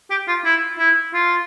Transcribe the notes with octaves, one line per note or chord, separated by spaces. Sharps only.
G4
F4
E4
E4
F4